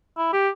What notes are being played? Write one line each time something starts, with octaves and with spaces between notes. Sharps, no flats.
E4
G4